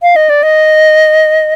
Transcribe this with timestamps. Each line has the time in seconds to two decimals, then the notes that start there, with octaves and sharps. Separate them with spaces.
0.02 F5
0.16 D#5
0.29 D5
0.43 D#5